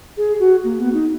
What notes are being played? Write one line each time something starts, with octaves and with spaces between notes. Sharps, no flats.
G#4
F#4
A#3
B3
D#4